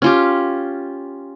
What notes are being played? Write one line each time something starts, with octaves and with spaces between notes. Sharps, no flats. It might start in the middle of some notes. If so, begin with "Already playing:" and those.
C#4 F4 G4